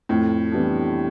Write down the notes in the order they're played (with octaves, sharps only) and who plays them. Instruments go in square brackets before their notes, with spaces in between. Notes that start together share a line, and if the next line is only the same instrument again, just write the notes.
[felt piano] F2 [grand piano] A2
[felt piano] E3 G3 B3 D4